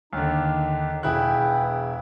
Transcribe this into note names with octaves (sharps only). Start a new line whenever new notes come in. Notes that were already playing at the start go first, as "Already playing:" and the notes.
D#2 D3 D#4
E1 E4 G#4 B4 G5 F#6